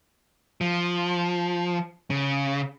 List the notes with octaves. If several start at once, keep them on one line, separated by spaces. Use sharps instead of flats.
F3
C#3